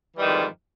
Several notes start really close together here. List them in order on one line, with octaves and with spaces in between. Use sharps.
E3 G3 D#3 F2 G#2